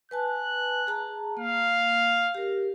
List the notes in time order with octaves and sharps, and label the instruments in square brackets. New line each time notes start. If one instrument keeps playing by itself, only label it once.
[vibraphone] B4 G#5 A5 [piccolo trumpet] F#6
[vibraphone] G#4 A5 A#5
[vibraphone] A#3 [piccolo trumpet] F5
[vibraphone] G4 A#4